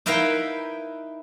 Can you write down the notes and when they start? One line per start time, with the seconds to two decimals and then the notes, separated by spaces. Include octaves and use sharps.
0.06 D#4 E4 A#4 B4 F5 G5